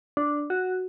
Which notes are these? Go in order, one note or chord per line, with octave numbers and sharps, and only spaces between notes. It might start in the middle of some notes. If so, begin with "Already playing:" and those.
D4
F#4